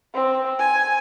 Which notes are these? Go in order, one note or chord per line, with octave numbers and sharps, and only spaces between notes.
C4
G#5